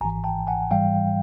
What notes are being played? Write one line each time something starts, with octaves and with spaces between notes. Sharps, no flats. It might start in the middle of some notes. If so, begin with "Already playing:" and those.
G#1 G#2 E3 G#5 A#5
G5 A5
F#5 G#5
G#2 E3 G3 F5 G5